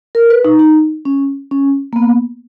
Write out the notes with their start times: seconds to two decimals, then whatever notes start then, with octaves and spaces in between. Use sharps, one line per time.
0.15 A#4
0.30 B4
0.45 D#4
0.59 D#4
1.05 C#4
1.51 C#4
1.93 A#3
1.96 B3